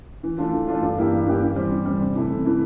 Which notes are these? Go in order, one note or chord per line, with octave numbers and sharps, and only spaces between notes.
E3
A3 D4 F4
E3
A3 D4 F4
G2
E3 A#3 E4 G4
G2
E3 A#3 E4 G4
E3
G3 C4
E3
G3 C4
C3
E3 A3 E4
C3
E3 A3 E4